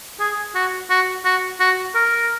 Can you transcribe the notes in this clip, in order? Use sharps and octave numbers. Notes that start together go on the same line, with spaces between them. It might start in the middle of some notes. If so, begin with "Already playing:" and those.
G#4
F#4
F#4
F#4
F#4
A#4